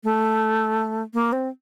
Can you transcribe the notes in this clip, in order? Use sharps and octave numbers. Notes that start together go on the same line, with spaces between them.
A3
A#3
C4